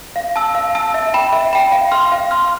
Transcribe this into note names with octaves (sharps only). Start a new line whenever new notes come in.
F5
A5 E6
F5
A5 E6
E5
G5 B5
E5
G5 B5
F5
C6 F6
F5
C6 F6